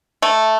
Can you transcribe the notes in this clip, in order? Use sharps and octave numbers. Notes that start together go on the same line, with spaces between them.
A3